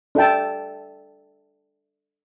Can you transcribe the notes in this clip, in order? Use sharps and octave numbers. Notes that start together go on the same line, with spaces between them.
D4 A4 E5 G5 A5